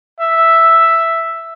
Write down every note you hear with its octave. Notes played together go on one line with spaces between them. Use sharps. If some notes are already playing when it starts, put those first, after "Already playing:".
E5